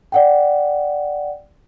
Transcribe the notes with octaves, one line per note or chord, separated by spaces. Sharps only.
D5 F#5 G5